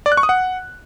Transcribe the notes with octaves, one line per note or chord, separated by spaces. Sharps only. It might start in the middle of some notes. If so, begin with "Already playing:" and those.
D5
F#6
C#6
D#6
F#5